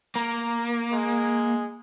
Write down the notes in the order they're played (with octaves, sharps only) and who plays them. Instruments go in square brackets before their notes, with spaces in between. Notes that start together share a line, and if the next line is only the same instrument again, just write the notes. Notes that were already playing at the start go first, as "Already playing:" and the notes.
[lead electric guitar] A#3 [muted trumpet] A#5
[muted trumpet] G#3